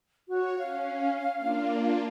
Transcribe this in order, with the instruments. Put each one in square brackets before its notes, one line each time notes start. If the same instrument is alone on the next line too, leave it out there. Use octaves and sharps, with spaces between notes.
[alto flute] F#4 [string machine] C#5
[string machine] C#4 [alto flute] F5
[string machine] A#3 D4 F4